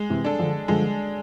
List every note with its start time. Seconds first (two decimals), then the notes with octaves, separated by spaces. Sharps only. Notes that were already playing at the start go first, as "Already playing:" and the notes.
Already playing: G#3
0.09 C3 E3
0.24 D4 A4
0.39 D3 F3
0.68 D3 F3 G#3